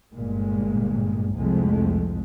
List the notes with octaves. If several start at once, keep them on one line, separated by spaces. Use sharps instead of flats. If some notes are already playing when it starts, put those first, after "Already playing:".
G1 A#2 G#3
C2 F2 A2 G#3 A3